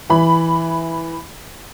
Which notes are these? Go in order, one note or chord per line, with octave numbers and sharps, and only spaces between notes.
E3 B5